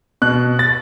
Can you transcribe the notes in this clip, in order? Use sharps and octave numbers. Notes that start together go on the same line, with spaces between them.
B2 F#6
A6